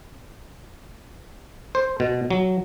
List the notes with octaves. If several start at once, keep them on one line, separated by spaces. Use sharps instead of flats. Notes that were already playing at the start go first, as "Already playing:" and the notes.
C5
B2
F#3